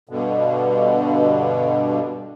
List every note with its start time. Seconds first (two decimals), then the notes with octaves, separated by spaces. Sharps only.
0.09 G2 B2 D3